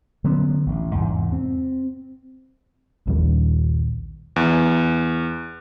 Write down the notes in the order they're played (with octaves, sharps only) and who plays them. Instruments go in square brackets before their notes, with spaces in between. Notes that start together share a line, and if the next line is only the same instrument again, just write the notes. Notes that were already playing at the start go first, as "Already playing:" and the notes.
[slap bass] D3 F#3 B3 C#4
A1
E2 G#2 C3
C4
[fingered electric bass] A#1 D#2 A#2 G3
[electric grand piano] E2